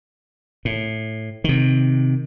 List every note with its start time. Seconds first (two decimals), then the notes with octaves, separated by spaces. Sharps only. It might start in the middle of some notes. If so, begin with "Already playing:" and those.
0.65 A2
1.44 C3 D#3